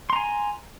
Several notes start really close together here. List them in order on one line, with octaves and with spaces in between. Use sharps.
C6 A#5 G#5